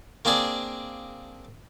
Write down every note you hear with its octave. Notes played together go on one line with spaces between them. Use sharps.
A#3 C4 D4 G#4 D5